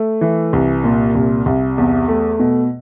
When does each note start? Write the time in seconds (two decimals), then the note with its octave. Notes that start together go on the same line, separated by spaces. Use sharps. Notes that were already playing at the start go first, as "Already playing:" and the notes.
Already playing: A3
0.21 E3
0.53 C2
0.84 A#2
1.15 C2
1.46 C2
1.78 E2
2.08 A3
2.39 B2